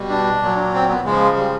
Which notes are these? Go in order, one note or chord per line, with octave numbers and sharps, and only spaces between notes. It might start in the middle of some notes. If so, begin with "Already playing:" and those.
Already playing: B2 G3
D4
A#2 F#3
C4
B3
C#3 F3 G#3
G3